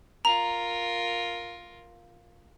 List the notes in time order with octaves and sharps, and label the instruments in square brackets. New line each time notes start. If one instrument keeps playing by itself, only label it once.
[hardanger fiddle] F4 A#4 [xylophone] A#5